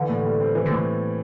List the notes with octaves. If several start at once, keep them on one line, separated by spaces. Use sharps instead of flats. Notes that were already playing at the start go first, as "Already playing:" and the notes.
Already playing: D3 E3
A2
G3
C4
E3
A2 D3